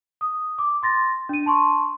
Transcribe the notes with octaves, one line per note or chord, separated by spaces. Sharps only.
D#6
D6
C6 A6 A#6
D4 D#7
A5 C6 C#6